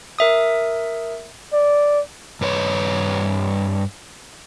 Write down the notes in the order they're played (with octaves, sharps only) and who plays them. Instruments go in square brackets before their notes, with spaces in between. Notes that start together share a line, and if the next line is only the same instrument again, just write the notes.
[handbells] A#4 E5 D#6
[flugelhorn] D5
[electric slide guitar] G2 B4 C#5